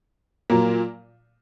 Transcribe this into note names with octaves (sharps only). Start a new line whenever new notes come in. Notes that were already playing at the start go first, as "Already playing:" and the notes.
A#2 F#3 A#3